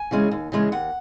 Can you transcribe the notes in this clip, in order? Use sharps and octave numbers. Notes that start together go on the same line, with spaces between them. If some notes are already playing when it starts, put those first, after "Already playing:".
Already playing: G#5
C#3 E3 G#3 C#4
D#2
C#3 E3 G#3 C#4
D#2 F#5